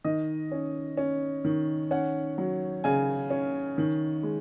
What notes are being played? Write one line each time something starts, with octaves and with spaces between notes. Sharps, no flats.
D#3 D#5
C#4
C#4
D#3
C#4 F#5
F#3
C#3 G#5
C#4
D#3
G#3